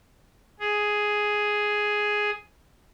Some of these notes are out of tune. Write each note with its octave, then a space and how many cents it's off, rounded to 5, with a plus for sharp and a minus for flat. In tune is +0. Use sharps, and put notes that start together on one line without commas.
G#4 +5